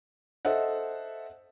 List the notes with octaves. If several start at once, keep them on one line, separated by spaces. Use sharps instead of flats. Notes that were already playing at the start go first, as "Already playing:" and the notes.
A4 C5 D#5 E5 F#5